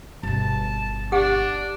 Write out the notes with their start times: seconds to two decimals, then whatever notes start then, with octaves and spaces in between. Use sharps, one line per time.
0.23 G1 B2 A5
1.12 D4 G4 F#5 D6